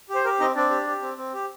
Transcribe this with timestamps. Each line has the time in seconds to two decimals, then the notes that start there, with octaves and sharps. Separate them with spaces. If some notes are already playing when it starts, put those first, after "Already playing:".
0.09 G4
0.15 C5
0.24 G4 A#4
0.40 C4 D#4 D#5
0.55 C4 D4 D5
0.71 G4
0.87 G4
1.02 C4
1.17 C4
1.33 G4